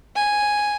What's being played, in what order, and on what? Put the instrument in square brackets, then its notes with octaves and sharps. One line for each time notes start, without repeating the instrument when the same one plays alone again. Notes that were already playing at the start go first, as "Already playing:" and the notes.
[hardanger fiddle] G#5